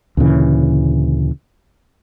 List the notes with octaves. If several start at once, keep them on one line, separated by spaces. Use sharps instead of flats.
D2 A#2 C#3 E3